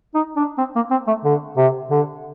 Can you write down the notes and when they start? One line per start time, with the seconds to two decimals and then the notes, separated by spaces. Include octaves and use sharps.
0.14 D#4
0.36 D4
0.58 C4
0.75 A#3
0.91 C4
1.07 A3
1.24 D3
1.57 C3
1.91 D3